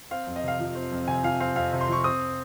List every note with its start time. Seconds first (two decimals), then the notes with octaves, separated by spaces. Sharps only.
0.11 C4 F5
0.27 F2
0.36 D#5
0.43 C3 F5
0.59 F3
0.75 C4
0.91 F2
1.08 C3 G#5
1.23 F3 F5
1.40 C4 F5
1.56 F2 F5
1.73 C3
1.81 C6
1.88 F3 C#6
2.04 C4 D#6